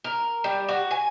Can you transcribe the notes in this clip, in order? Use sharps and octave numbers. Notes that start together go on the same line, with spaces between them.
A#4
G3
F#4
G#5